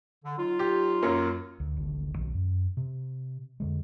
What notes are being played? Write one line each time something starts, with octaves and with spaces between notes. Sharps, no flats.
D3
F#3 D#4 F4
G4
F#2 A#3 C#4
D2
D1 G#1 D3
B1 D#3
F#2
C3
F2 D3 G#3